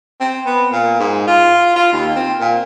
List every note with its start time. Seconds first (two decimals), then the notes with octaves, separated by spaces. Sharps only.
0.20 C4
0.46 B3
0.72 A#2
1.00 G#2
1.27 F4
1.76 F4
1.93 D#2
2.16 C4
2.40 A#2